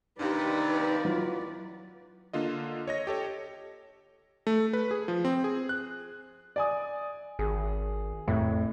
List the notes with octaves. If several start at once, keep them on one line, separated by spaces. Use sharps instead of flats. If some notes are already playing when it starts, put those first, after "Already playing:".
D#2 C3 D4 D#4 G4 B4 D5
F#3 E4 F4
D3 A#3 F4 D#5
C#5 D#5 A#6
G4 A4 C#5
A3
B4
G#4
F3
C4
G#4
F#6
D5 G#5 D#6
G#1 G#4
F2 A2